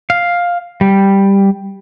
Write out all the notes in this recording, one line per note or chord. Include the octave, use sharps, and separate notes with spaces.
F5
G3